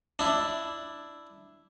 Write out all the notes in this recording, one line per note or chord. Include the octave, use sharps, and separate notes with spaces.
D4 E4